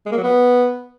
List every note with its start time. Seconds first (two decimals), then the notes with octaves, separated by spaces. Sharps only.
0.06 G#3
0.12 A#3
0.18 F#3
0.24 B3